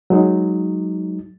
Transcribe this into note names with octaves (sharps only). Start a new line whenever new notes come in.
F#3 G#3 D#4